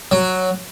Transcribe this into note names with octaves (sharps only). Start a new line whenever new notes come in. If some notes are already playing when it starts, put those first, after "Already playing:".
F#3